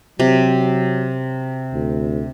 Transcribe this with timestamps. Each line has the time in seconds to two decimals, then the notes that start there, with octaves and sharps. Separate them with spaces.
0.20 C3 F#3
1.73 D2